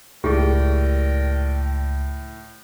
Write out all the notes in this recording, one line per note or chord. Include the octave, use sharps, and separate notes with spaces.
C#2 A2 G4 G#4 A#4 D5 G5